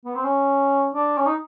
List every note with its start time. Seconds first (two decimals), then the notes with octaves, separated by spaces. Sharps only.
0.05 B3
0.15 C4
0.24 C#4
0.94 D4
1.18 C#4
1.26 D#4